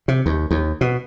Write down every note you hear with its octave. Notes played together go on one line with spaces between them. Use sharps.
C3
D#2
D#2
B2